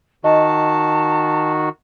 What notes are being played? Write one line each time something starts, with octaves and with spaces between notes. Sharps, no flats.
D#3 F#4 D#5 A5